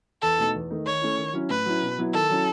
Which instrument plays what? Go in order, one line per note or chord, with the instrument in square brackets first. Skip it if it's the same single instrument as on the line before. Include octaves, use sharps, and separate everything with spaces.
[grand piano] E2 [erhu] A4
[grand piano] B2 A3 D#4
E2
D#3 A3 D#4
[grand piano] D#3 [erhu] C#5
[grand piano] A3 C#4 E4
D#3
F#3 C#4 E4
[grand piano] A2 [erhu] B4
[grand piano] F#3 C#4 E4
B2
F#3 B3 E4
[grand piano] D#3 [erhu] A4
[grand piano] F#3 C#4 E4